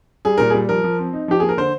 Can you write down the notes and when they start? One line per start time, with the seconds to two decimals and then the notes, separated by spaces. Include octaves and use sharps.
0.25 G3 G#4
0.38 A#2 A#4
0.50 G#4
0.54 G3
0.69 F3 A#4
0.84 F3
0.99 C4
1.13 D#4
1.28 F3 G4
1.40 A#3 G#4
1.49 A#4
1.57 D3 C5